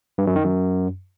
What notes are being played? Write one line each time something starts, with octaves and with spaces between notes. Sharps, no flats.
G2
F#2
D#3
F#2